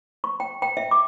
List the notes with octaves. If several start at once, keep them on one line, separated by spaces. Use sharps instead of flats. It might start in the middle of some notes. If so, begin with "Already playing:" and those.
C#6
G5
G5
E5
D6